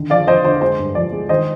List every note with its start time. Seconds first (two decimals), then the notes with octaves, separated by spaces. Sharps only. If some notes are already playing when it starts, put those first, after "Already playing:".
Already playing: D3 D#3
0.10 F3 D5 F5
0.27 F3 C5 D#5
0.44 D3 C5
0.61 G#3 C5
0.79 G2
0.95 F3 D5
1.12 G#3
1.29 D#3 C5 D#5